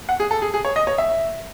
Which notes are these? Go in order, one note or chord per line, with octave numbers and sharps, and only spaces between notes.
F#5
G#4
A4
G#4
G#4
C#5
D#5
C#5
E5